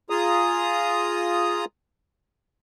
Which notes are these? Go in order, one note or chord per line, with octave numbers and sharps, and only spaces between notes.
F4 G#4 A#5 D#6